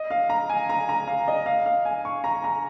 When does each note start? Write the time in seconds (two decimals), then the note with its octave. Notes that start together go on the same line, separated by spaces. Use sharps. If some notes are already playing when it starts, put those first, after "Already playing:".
Already playing: D#5
0.11 F5
0.29 A#5
0.49 G#5
0.69 A#5
0.89 A#5
1.07 F5
1.28 D#5
1.46 F5
1.66 F5
1.85 G#5
2.05 C#6
2.24 A#5
2.44 A#5